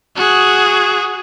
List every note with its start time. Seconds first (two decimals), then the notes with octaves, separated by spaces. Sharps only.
0.16 F#4 G#4